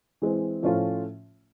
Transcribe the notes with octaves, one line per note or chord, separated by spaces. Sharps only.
E3 G#3 C4
A2 F3 A3 C#4 F4